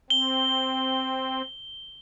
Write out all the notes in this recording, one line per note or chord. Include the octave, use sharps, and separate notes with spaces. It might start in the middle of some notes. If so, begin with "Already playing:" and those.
C4 G7